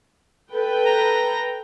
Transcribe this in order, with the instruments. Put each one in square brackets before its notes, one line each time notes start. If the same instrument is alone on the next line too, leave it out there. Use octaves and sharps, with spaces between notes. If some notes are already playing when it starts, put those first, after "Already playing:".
[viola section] A4 B4 G5
[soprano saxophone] A#5